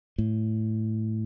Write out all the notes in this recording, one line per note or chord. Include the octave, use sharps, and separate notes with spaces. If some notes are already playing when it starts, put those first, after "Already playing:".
A2